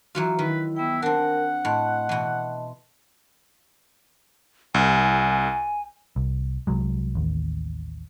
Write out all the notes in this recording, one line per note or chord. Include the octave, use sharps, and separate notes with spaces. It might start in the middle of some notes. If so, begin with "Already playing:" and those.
E3 F#3 F4 F#4 A#5
D#3 E4 B4
B3 E4 G5
C4 D4 A#4 F#5
A2 D#5 A5 C6
B2 E3
C2 G#5
C2
C2 F#3 G#3
A1 D#2